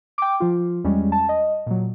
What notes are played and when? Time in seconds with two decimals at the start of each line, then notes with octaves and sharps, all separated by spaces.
0.18 G5 D6
0.40 F3 F4
0.84 E2 G3 G#3 C#4
1.12 A5
1.29 D#5
1.67 A#2 F#3